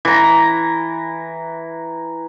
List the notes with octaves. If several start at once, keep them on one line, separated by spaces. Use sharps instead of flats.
E3 A#5